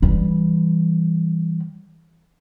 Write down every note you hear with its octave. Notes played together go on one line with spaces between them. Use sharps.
E3 G3